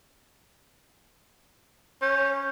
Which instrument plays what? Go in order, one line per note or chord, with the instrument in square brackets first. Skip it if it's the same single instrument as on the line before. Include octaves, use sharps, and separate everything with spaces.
[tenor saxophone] C#4 [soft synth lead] G6